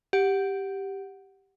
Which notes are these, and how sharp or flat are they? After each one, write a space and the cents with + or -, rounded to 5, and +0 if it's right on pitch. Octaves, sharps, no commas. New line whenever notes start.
G4 +0 F#5 +0